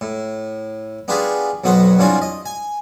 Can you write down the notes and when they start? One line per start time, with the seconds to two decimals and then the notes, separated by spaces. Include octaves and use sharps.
0.01 A2
1.08 B3 D4 F4 G4 G#4
1.64 B1 F2 F#3 B3 F#4 C5
1.98 C2 G2 F#3 D4 F4 G#5
2.22 D#5
2.46 G#5